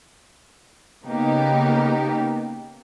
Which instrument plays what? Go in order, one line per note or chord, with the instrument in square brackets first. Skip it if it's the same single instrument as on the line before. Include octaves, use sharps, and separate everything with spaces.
[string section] C#3 A#3 B3 D#4 G4